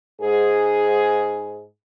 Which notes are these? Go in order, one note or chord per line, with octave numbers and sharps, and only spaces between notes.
G#2 G#4